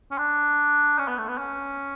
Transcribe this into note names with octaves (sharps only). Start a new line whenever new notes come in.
C#4
D4
C#4
B3
A3
B3
C#4